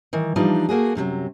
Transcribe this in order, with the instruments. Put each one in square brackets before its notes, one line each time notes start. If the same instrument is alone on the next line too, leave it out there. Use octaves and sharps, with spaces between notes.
[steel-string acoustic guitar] D#3 E3
E3 F3 G3 D4 D#4 F4
A3 A#3 F#4 G#4
F#2 C3 E3 F#3